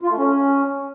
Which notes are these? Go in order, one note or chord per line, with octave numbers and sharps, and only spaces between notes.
F4
A3
C#4